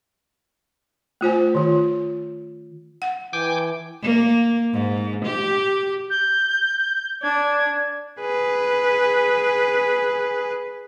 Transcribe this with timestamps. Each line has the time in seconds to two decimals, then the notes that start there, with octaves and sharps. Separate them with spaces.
1.21 A3 F4 C5 G#5
1.55 D#3 F4
3.02 F#5
3.33 E3 G5 G#5 D6
4.02 A#3
4.72 G#2
5.25 G4
6.10 G6
7.23 D4 G#6
8.20 G#4 B4